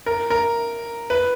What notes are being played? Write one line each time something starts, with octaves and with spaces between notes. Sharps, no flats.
A#4
A#4
B4